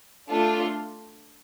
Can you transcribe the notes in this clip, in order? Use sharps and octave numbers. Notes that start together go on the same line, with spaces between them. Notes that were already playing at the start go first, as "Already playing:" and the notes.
A3 D4 F4